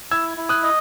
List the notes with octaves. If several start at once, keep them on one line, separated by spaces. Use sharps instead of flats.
E4 E6 G#6
E4
D#6 F#6
D#5